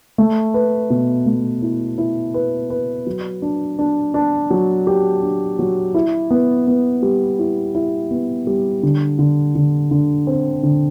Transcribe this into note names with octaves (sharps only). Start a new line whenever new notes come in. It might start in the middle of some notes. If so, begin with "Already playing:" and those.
A3
B4
B2
A3
E4
E4
B4
B4
F#3
D4
D4
D4
F#3
G4
D4
F#3
E4
B3
B3
G3
E4
E4
B3
G3
D3
D3
D3
D3
C4
D3